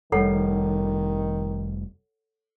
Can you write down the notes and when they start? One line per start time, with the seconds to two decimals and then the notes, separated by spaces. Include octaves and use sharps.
0.12 F1 D#3 G3 A4 C#5 F#5